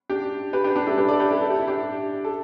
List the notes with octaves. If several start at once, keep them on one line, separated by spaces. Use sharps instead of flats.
D4 G4
G4 B4
D4 G4
D4 G4
E4 A4
G4 B4
A4 D5
G4 B4
E4 A4
A4
G4
E4
D4 G4
A4